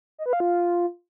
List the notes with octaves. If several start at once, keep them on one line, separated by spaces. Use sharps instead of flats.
D#5
B4
F5
F4